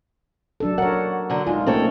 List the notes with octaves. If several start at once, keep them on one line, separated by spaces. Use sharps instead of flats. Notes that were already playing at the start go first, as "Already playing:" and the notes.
F#3 D4 A4
A#4 C#5 F#5
D3 F#3
G#3 D#4 F4
A3 A#3 C4 C#4 A4 C#5